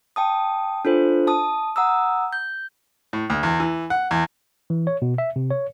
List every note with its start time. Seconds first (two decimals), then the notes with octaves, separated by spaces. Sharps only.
0.16 G5 A5 D#6
0.85 D4 F4 A4 C5
1.27 A5 D#6
1.76 F#5 A#5 D#6 E6
2.33 G6
3.13 A2
3.30 D2
3.43 E2
3.60 E3
3.90 F#5
4.11 E2
4.70 E3
4.87 C#5
5.02 B2
5.18 E5
5.36 C3
5.51 C#5